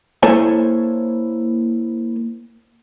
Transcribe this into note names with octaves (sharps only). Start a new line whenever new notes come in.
A#3 E4 A4 C5 C#5 G#5